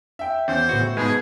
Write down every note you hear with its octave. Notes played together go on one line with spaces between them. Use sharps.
E5 G5
E2 C#4 C5
A2 C#3 B3 F#4
G#2 B2 G#3 G#4 B4